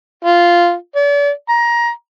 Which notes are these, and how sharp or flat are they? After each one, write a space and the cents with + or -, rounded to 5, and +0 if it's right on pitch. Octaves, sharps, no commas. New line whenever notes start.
F4 -5
D5 -40
A#5 +20